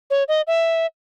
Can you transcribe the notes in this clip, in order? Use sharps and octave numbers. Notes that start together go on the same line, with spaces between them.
C#5
D#5
E5